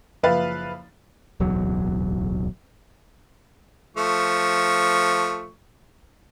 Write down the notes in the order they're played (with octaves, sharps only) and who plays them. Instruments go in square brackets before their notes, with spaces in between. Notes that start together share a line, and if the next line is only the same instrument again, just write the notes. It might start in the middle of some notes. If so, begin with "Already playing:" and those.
[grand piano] F#1 F3 B4 E5 F5 A6
[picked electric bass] D1 B1 E2 F#3
[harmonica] F3 A3 C#6